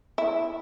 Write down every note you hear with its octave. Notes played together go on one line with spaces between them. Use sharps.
E4